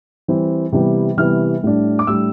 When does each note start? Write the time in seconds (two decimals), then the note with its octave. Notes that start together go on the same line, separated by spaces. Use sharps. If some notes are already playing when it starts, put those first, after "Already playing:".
0.28 E3 G3 C4
0.72 C3 E3 G3 B3
1.17 C3 E3 G3 B3 F6
1.63 A2 G3 D4
1.99 D6
2.07 A2 G3 D4 E6